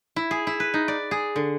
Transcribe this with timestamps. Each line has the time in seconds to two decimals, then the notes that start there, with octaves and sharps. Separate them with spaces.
0.16 E4
0.31 G#4
0.47 E4
0.60 B4
0.74 D#4
0.88 D5
1.11 G#4
1.36 D3